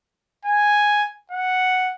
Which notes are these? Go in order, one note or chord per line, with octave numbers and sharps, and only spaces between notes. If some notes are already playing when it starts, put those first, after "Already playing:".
G#5
F#5